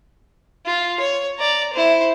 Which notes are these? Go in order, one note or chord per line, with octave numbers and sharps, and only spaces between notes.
F4
C#5
D5 A#5
E4 C5